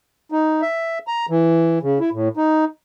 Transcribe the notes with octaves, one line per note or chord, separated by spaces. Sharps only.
D#4
E5
A#5
E3
C#3
E4
A2
D#4